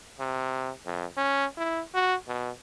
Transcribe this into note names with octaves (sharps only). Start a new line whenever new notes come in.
C3
F2
C#4
E4
F#4
B2